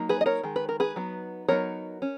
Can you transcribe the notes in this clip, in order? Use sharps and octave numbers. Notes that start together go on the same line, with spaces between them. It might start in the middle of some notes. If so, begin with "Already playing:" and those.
Already playing: F#3 A#3 D#4
G#4 B4
D#5
A#4 C#5
D#3 G#3
B4
A#4
G#4 B4
F#3 B3 D#4
F#3 B3 D#4 A#4 C#5
C#4